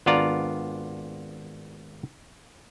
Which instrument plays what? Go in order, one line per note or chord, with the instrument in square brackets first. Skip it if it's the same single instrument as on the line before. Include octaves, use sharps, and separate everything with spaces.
[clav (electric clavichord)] G#1 B3 D4 F4 D5 A#5